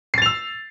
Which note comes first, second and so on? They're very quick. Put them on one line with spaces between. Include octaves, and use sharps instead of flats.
C7 A6 F7 E6